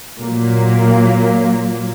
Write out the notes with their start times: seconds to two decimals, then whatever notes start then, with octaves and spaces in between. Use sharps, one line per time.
0.20 A#2 F#3 A#3